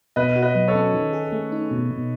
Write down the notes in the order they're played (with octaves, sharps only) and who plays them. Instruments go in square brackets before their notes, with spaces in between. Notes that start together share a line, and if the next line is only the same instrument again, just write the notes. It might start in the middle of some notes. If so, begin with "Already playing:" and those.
[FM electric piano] B2 [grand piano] B4 D#5
[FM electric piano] F#4
[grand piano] B4 D#5
[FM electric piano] F#3
[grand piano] A4 C#5
[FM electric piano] C#4
D#3
G#4
A3
D#4
B2
B2